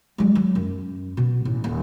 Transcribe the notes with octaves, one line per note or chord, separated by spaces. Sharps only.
F#3 G#3
F#3
F#2
B2
A1
D#1